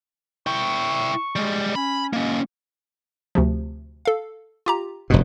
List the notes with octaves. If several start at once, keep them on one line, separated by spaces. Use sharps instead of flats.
E4 G5 C#6
G3 G#3
C#4 B5
G#3 A#3 C#4
D2 C3 F3
A4 F5
F4 G4 A#5
F1 G2 B2